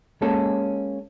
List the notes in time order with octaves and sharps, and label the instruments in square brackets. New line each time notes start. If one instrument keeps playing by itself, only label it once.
[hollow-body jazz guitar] G#3 A#3 C#4 A4